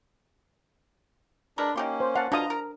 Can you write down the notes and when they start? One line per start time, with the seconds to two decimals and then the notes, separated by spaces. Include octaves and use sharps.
1.58 G#3 D4 A#4 B4
1.76 A#3 C#4 D#4 G4 C6
2.00 C5
2.15 F5 F#5 A5
2.32 B2 D4 F4 D#5 A5 A#5 D#6
2.50 A#4